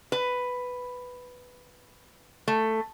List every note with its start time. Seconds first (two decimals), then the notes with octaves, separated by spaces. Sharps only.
0.12 B4
2.48 A3